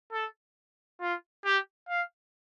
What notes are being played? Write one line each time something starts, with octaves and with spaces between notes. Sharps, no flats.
A4
F4
G4
F5